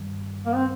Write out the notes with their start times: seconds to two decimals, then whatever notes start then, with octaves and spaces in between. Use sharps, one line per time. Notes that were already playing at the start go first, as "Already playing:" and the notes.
Already playing: G2 D#3 G3
0.46 A#3
0.55 C4